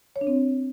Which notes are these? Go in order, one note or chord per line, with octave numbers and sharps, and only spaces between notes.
C#5
D4
C4